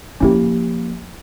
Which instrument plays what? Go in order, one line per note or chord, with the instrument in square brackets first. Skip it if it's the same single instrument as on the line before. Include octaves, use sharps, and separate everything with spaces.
[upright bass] F3 A#3 [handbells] C#4 E4 G4